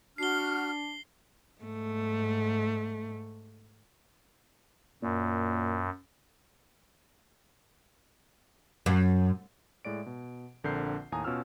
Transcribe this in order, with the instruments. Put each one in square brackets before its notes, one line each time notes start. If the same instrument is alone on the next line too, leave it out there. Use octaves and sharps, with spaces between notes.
[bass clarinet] D4 [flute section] F#4 F6 [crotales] C7 G7
[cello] G#2 A3
[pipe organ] F#2 [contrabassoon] A#2
[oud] F#2
[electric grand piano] A2 G#3 D5 D7
B2
A#1 D3 C4 A#4 G6 C7
D#2 A2 G#5 A#5 D#6
B2 C#4 F4 E6 F6